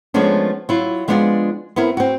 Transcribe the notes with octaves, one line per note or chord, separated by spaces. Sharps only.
F3 G#3 A3 B3 C#4 D4
F#3 E4 F4
F3 G#3 B3 D4 D#4 F4
B3 C4 E4 A#4
C4 F#4